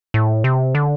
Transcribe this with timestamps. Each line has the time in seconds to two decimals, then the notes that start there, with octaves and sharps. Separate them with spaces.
0.14 A2
0.44 C3
0.75 D3